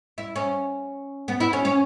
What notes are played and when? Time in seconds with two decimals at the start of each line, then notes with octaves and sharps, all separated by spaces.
0.18 E4
0.36 C#4
1.28 B3
1.40 E4
1.53 C#4
1.65 C#4